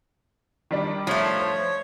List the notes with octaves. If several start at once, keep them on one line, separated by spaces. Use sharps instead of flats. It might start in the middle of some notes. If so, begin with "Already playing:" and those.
D#3 G3 D4
F3 A3 C#5
C5